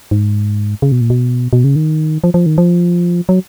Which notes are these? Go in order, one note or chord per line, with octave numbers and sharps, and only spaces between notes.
G#2
C#3
B2
A#2
B2
B2
C#3
D#3
F3
F3
D#3
F3
F#3